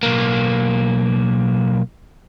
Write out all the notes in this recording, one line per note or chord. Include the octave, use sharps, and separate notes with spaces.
B1 A#3